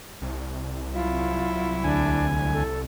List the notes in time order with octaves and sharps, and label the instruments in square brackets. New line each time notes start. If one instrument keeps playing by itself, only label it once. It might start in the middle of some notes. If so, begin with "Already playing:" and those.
[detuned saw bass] C2
[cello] F#3 E4 [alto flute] F4
[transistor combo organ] D2 G#5 [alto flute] D4
[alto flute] A4